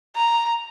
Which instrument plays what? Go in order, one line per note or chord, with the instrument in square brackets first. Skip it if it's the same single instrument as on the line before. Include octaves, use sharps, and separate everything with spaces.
[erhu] A#5